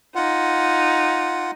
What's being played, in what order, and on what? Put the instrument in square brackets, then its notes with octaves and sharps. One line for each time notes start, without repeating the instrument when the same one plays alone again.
[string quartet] D#4 [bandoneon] F4 F#5